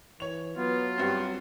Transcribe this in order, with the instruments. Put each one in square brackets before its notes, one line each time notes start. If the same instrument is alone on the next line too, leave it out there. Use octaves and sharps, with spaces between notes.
[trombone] E3 [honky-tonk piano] C#5 F7
[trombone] F#3 [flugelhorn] B3 [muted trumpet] F4
[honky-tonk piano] G2 C4 [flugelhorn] G4